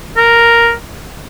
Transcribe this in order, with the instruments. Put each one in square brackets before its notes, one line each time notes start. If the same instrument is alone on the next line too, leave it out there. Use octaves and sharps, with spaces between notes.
[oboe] A#4